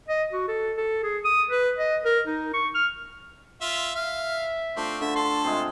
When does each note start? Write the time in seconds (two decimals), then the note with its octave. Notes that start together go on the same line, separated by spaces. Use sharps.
0.08 D#5
0.32 F#4
0.48 A4
0.77 A4
1.03 G#4
1.24 D#6
1.50 B4
1.78 D#5
2.05 A#4
2.27 D#4
2.54 C#6
2.75 F6
3.61 F4 E5
3.95 E5 F5
4.77 A3 C4 D4 F4
5.01 D3 E5
5.16 A4 C6
5.44 C3 G#3 F4 C6